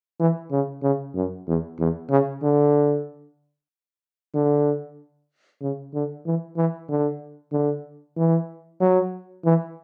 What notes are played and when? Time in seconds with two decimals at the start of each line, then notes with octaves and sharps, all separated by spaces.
0.20 E3
0.51 C#3
0.82 C#3
1.15 F#2
1.47 E2
1.79 E2
2.10 C#3
2.42 D3
4.34 D3
5.61 C#3
5.94 D3
6.26 E3
6.57 E3
6.89 D3
7.52 D3
8.17 E3
8.80 F#3
9.45 E3